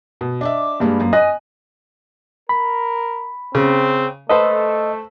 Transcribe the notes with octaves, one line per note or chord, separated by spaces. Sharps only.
B2
D4 D#5 E5 D6
G2 G3 G#3 A#3
F#2
D#5 G#5 F#6
A#4 B5
C#3 C4
A3 A4 B4 C5 D#5